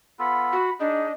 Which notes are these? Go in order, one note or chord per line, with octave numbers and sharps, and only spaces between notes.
B3 F4 A4 B5
F#4
D4 D#4 G#4 D#5